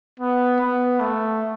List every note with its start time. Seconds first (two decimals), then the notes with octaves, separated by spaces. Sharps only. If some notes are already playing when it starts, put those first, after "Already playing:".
0.20 B3
0.60 B3
1.00 A3